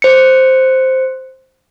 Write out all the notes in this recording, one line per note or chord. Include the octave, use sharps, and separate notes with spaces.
C5 C#7